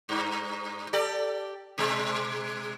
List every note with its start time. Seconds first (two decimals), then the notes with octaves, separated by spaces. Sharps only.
0.09 G2
0.93 G4 A4 D5
1.78 B2 G#3